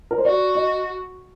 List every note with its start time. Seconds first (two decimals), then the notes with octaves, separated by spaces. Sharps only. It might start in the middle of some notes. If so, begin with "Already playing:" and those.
0.11 A#4
0.18 C5
0.25 F#4 D5
0.55 D#5